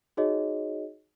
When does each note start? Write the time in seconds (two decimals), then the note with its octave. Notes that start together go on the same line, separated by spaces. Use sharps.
0.17 D#4 F#4 G#4 C#5 D#5